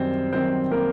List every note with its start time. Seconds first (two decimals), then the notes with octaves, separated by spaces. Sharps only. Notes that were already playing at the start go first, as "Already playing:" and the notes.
Already playing: F#2 D#3 G3 C4 C5
0.33 F#2 D#3 G3 C4 C5
0.71 A#3 A#4